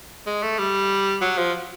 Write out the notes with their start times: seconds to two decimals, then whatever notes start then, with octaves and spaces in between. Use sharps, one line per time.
0.27 G#3
0.43 A3
0.59 G3
1.22 F#3
1.38 F3